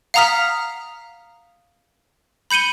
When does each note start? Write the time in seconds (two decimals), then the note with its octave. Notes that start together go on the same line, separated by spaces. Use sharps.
0.14 F5 F#5 A#5 D#6 F6 B6
2.51 B5 G6 C#7 D#7 G7